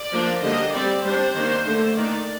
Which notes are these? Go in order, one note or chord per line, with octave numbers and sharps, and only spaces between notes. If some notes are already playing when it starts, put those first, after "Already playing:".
Already playing: D5
F3 A#3 D4
D3 G3 A#3 D4 D#5
G3 C4 D5
G3 D4 C5
D#3 A#3 D4
D3 A3 D4
D#3 A#3 D4 D5